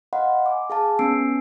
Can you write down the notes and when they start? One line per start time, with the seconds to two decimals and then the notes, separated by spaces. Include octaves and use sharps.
0.13 D#5 F5 F#5 B5 C6
0.46 G#5 D6
0.70 G#4 F5 A5
0.99 B3 C#4 G#5 E6 C7 D7